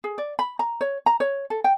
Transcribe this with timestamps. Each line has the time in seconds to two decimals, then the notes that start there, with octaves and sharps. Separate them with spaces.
0.04 G#4
0.18 D5
0.39 B5
0.59 A#5
0.81 C#5
1.06 A#5
1.20 C#5
1.50 A4
1.64 G5